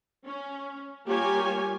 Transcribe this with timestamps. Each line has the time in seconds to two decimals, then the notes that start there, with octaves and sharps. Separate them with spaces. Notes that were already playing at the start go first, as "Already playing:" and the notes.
0.25 C#4
1.05 G3 A#3 F4 G4 C#5 G#5